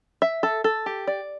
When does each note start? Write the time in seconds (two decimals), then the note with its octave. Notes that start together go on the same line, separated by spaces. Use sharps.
0.22 E5
0.43 A4
0.64 A4
0.86 G4
1.07 D5